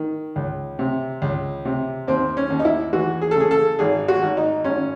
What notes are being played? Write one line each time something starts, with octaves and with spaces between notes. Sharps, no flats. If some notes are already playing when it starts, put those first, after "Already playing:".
Already playing: D#3
C#2
C3
C#2
C3
D#2 C4
C#4
D#2
D#4
E4
E3 F#4
G#4
A4
C#3 G#4
A4
G#1 G#4
F#4
G#1
D#4
G#1 C#4